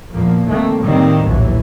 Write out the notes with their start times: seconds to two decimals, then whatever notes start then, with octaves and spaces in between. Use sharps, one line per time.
0.12 E2 A#2 F3 A#3 B3
0.46 D#3 A3 A#3 C4
0.82 A2 D#3 G3 A#3 C4
1.26 A#1 D#2 A2 E3 F#3